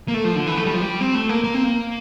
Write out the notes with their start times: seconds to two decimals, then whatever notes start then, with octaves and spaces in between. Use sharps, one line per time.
0.08 A#3
0.14 A3
0.24 F3
0.36 D3
0.47 E3
0.57 A3
0.65 G3
0.74 F3
0.82 G3
1.00 C4
1.15 A3
1.29 A#3
1.44 A#3
1.54 C4
1.64 A#3